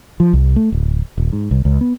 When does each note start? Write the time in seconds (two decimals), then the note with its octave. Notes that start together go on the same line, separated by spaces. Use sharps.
0.20 F3
0.33 C2
0.56 A3
0.72 D1
1.18 D#1
1.32 G#2
1.51 C2
1.65 C#2
1.81 B3